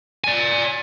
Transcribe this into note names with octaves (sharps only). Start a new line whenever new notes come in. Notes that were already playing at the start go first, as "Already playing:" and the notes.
D5 G#5